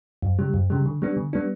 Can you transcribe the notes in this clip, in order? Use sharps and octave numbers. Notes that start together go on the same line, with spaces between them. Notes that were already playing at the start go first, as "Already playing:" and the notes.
F#2
C#3 G3
F#2
C#3 G3
D3
G3 B3 D4
D3
G3 B3 D4